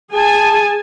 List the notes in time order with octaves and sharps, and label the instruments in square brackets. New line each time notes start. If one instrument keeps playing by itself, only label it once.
[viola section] G#4 G#5 A5